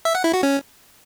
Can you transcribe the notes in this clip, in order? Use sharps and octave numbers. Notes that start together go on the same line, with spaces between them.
E5
F#5
E4
F#4
C#4